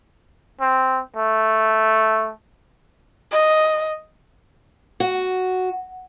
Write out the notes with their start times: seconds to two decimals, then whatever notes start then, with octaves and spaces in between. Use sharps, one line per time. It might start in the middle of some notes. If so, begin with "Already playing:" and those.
0.61 C4
1.17 A3
3.31 D#5
5.00 F#4